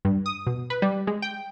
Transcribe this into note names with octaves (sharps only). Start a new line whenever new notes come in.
G2
D#6
B2
B4
G3
G#3
G5